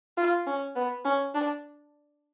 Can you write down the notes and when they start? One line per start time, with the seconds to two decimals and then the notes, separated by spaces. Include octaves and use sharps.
0.17 F4
0.47 C#4
0.76 B3
1.05 C#4
1.35 D4